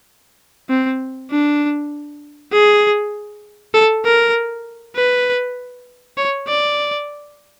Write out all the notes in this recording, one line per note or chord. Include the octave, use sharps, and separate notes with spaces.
C4
D4
G#4
A4
A#4
B4
C#5
D5